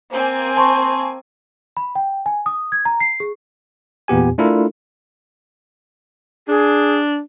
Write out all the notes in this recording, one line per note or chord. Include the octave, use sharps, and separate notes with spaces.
A#3 C4 C5 G#5
A5 C6 C#6
B5
G5
G#5
D#6
G#6
A#5
C7
G#4
E2 A#2 B3 G4 G#5
A3 D4 E4 F4 A4 A#4
D4 G#4